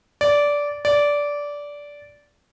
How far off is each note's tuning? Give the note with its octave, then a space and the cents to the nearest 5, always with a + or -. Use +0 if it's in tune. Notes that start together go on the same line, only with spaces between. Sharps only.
D5 -15
D5 -15